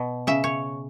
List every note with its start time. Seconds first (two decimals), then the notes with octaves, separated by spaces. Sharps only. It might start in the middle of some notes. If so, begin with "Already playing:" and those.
Already playing: B2
0.27 C#3 E5
0.44 C#5